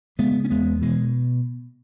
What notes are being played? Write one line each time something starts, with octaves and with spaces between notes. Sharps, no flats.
C#3 G#3 B3
C#4
E2 G#3 B3
B2 E3 G#3